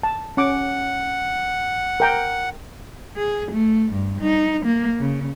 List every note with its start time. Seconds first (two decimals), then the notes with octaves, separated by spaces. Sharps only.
0.03 A5
0.37 C#4 F#5 D6
2.00 A#4 G5 A#5
3.17 G#4
3.52 A3
3.92 G2
4.22 D#4
4.65 A#3
5.00 C#3